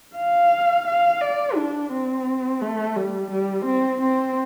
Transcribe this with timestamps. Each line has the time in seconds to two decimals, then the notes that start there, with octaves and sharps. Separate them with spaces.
0.16 F5
0.87 F5
1.21 D5
1.56 D4
1.91 C4
2.61 A3
2.96 G3
3.31 G3
3.65 C4
4.01 C4